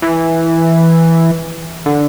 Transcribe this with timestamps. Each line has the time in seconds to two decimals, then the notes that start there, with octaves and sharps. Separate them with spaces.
0.02 E3
1.86 D3